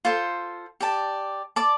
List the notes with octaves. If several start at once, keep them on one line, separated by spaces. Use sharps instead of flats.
F4 A4 C5
G4 D5 A5
D5 A5 D6